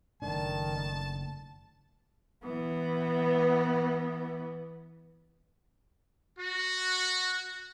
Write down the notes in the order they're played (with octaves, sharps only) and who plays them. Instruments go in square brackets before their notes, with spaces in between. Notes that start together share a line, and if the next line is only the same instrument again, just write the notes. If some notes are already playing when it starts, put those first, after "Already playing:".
[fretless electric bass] F#1 A3 D4 [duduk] D#3 [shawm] A5
[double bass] E3 B3
[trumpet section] F#4